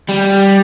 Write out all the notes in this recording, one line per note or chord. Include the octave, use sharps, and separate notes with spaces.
G3